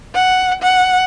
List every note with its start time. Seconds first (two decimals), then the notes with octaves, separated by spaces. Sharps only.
0.15 F#5
0.62 F#5